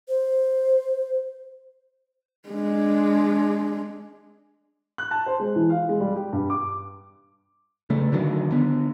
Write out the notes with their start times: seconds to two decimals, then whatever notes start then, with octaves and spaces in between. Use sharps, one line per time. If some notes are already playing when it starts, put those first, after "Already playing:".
0.08 C5
2.49 G#3 D4
4.98 F#6
5.11 A5
5.26 C5
5.40 G#3
5.56 E3
5.70 F5
5.89 G#3
6.00 G3
6.16 G4
6.33 G2
6.50 D6
7.90 C#3 A3
8.12 D3 D#3 F#3
8.51 D3 B3